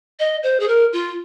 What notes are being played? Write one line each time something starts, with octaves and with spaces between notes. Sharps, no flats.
D#5
C5
G#4
A#4
F4